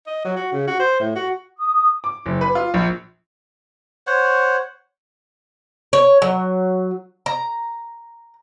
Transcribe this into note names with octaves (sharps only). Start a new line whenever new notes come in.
D#5
F#3
F#4
C#3
F#4
C5
A2
F#4
D#6
D6
F#1
B4
F4
A#1
C5 C#5 F#5
C#5
F#3
A#5